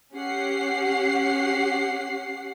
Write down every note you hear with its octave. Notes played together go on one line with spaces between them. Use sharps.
C#4 G4 F#5 C7